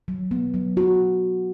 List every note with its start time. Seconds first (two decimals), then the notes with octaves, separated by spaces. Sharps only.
0.08 F#3
0.31 B3
0.54 F#3
0.77 F#4